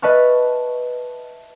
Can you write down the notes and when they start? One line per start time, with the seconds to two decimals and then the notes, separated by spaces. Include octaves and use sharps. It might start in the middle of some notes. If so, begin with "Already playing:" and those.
0.02 B4 D#5 E5 A5 C#6 F6